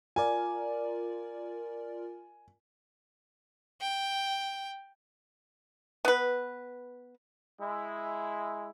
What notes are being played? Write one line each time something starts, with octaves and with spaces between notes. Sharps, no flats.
F4 A#4 D5 G#5
G5
B3 B4
G#3 E4